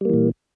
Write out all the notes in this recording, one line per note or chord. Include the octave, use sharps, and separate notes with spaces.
A#2 E3 G3 A#3